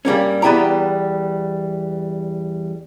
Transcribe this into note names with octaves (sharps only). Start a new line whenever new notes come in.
G2 G3 A#3 C#4
E2 G3 B3 E4 G5 A#5